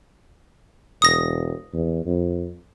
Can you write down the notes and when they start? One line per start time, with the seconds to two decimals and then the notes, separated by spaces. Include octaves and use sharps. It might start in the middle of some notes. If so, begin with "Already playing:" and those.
1.02 E1 D#6 A#6
1.74 E2
2.06 F2